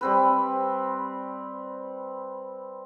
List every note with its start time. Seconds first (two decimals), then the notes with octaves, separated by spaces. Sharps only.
0.01 G3 C4 B4